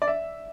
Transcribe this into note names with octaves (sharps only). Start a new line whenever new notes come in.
D5
E5